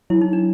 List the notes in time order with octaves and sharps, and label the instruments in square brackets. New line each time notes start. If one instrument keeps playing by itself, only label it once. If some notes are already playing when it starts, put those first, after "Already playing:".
[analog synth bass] F#3 [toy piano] E4
[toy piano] D#4
D4